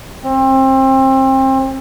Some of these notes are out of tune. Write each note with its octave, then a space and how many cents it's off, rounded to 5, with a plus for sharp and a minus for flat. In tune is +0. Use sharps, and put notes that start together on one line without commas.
C4 +30